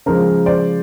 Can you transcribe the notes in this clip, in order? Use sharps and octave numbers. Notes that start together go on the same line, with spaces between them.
C#3 F3 G#3 A#4 C5
C5 D5